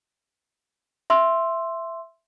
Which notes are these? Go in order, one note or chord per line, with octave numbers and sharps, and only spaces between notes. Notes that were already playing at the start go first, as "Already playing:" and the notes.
E5 C6 E6